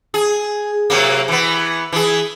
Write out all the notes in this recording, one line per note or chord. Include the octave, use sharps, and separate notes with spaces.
G#4
C3 F#3 A#3
E3 B3
E3 G#4